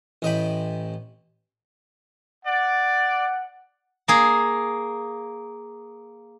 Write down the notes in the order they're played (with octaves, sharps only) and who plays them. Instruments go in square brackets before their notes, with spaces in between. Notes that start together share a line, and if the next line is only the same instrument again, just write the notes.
[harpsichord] A1 D#5 G5 B5
[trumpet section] D5 [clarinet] F#5
[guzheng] A#3 G#4